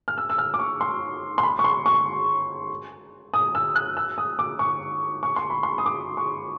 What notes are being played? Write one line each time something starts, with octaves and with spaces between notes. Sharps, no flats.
F6
E6
E6
F6
D6
C#6
C6
C6
B5
C#6
C6
C#6
D#6
E6
F#6
E6
D#6
D6
C#6
C#6
C6
B5
C6
D#6
D6
C#6